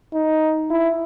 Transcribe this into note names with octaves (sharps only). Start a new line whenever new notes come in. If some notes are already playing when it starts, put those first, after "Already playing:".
D#4
E4